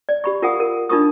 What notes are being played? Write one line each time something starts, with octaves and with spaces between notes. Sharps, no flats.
D5
G4 B5 C#6
F4 A#4 F5 F#5 G#5 D#6
A#4
D4 D#4 F4 A#4 C#6 D#6